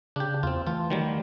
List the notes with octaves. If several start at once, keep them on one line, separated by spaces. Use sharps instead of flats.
C#3 D4 G4
E2 C4 F4
E3 A3 F4
D#3 F#3 G3